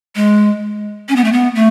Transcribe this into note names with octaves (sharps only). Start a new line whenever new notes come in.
G#3
C#4
B3
A3
B3
A3